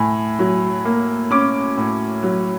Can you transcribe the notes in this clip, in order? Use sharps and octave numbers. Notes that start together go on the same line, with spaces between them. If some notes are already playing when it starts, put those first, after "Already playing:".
Already playing: A2 G#5
F#3
A#3
C#4 D6
A2
F#3